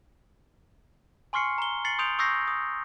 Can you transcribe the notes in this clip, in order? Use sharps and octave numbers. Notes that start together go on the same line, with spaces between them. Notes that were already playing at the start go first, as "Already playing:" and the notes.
G#5 C6 C#6 F6 C7 C#7
A#5 G7
A6 C7 C#7 F#7
C6 D#6 G6 D7 F7
C#6 D#6 E6 G6 A#6 C7
D#6